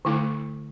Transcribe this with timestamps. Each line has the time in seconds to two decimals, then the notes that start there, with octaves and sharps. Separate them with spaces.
0.05 D3 A3 E4 A4